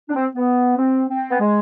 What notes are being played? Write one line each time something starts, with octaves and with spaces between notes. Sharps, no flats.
D4
C4
B3
C4
C4
B3
G#3